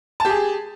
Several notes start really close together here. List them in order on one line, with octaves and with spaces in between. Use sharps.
A5 G4 G#4